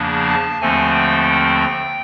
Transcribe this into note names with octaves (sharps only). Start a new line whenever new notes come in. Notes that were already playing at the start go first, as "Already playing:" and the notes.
Already playing: E2 C#3 F3 A#3 D4
A5
D#2 D3 F3 A3 C4 G#5
G5